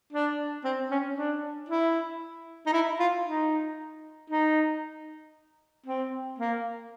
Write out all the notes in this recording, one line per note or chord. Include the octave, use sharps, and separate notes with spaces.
D4
C4
C#4
D4
E4
D#4
E4
F4
D#4
D#4
C4
A#3